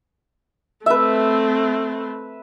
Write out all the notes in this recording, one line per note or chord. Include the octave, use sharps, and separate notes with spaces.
A3 C4 B4 E5